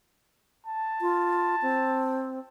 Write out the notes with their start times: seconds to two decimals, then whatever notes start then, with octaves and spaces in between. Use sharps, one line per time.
0.66 A5
1.01 F4
1.62 C4